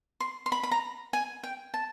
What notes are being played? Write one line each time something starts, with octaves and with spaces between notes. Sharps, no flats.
C6
C6
B5
B5
A#5
G#5
G5
A5